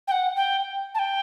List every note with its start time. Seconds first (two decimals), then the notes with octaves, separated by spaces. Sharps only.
0.07 G5
0.11 F#5
0.36 G5
0.94 A5
0.99 G5